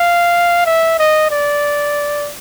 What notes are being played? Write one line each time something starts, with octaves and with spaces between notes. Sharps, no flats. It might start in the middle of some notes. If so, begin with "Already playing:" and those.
Already playing: F5
E5
D#5
D5